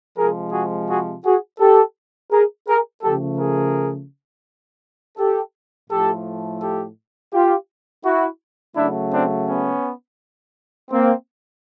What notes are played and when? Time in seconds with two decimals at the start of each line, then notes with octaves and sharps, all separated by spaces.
0.17 C3 F3 G#3 G#4 A#4
0.52 F#4 G#4
0.88 F#4 G#4
1.24 F#4 G#4
1.59 G4 A4
2.32 G#4 A#4
2.67 G#4 A#4
3.03 C#3 F3 A3 G4 A4
3.39 G#4 A#4
5.17 G4 A4
5.89 A2 F3 A3 G4 A4
6.61 G4 A4
7.32 F4 G4
8.04 E4 F#4
8.76 C#3 F#3 A3 D4 E4
9.12 C4 D4
9.48 B3 C#4
10.91 A#3 C4